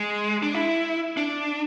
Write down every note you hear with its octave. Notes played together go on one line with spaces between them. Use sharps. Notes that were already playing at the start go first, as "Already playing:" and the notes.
Already playing: G#3
D4
E4
D4